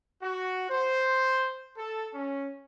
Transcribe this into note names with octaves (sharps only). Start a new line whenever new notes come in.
F#4
C5
A4
C#4